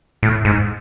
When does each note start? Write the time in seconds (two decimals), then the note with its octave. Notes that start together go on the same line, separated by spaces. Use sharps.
0.23 A2
0.45 G#2